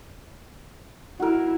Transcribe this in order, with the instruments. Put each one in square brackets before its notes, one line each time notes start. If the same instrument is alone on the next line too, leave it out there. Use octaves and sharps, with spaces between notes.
[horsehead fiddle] E4 [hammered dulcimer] F#4 A#4